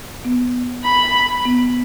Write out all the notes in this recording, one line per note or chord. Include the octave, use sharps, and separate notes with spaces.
B3
B5
B3